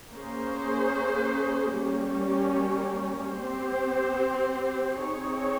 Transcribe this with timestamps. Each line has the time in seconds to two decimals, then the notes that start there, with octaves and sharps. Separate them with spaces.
0.10 A#3 C#4 G#4 C5
1.74 G3 A#3 C#4 G4
3.38 C4 G4 C5
5.01 C4 D#4 G#4 C#5